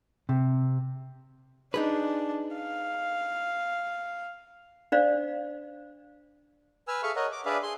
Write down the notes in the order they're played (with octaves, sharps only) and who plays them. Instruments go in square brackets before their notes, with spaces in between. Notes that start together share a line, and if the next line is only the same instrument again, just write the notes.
[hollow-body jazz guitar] C3
[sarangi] D4 [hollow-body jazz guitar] D#4 G#4 B4
[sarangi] F5
[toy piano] D4 C5 D5 F5
[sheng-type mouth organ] B4 G#5 E6 F6
G#4 A4 E5 F5 C#6 F6
A#4 C#5 D#5 F#5
D6
D4 G#4 B4 D5 E5 F5
G#4 C6